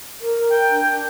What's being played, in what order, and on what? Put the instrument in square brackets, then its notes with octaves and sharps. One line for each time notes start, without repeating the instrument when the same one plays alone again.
[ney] A#4
[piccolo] G5
[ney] D4